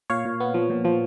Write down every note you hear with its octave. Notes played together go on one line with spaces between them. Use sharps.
A#2 C#5 F5
A#2
B3
F3
A#2
F3